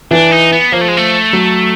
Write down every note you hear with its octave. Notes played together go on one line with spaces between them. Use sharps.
E3 D4
D#4
B3
F3 A#3
A3
G#3
A3
F#3